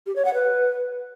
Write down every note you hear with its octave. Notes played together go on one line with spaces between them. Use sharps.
G4
C#5
F#5
B4